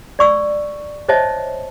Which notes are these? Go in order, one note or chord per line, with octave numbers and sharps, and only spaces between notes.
D5 C#6 E6
C5 C#5 D#5 E5 A5